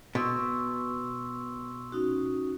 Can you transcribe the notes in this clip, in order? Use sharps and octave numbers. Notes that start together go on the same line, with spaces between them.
B2 C6 C#6 E6
C#4 D#4 F#4